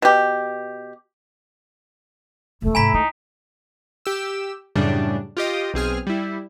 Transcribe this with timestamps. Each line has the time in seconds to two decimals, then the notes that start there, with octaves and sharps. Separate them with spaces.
0.02 B2 G4
2.62 E1 A3 E4
2.75 G#2 C3 E4 G#5 A#5 B6
2.94 D#4 E4
4.06 G4 E6
4.75 F#2 A2 C#3 G3 D4
5.37 F4 G4 D#5
5.74 B1 C4 G#4 F6
6.07 G3 E4